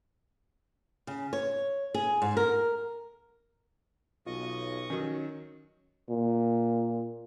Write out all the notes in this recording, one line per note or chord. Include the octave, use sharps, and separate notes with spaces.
C#3
C#5
G#4
G#2
A#4
B1 F4 D#5 C#6 D#6
D#3 F#3 C#4
A#2